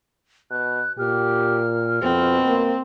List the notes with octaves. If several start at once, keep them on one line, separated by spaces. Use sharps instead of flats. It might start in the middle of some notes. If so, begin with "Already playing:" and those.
B2 F#6
A#2 G4 F6
F2 B2 C4
A#3